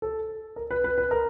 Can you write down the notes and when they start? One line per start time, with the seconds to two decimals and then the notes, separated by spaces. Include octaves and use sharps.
0.02 A4
0.56 A#4
0.71 B4
0.84 B4
0.98 B4
1.11 A#4